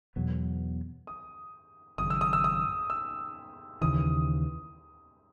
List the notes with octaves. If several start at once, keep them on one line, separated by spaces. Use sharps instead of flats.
E2 B2 F#3 B3
D#6
G#1 F#2 C#3 D#6
E6
D#6
E6
D#6
E6
D#2 C#3 E3 D#6